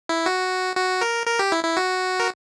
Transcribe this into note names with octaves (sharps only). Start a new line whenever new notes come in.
E4
F#4
F#4
A#4
A#4
G4
E4
E4
F#4
A#4